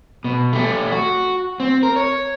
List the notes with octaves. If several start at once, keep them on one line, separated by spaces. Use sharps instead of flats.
B2
A3 G4
F#4
C4
A#4
C#5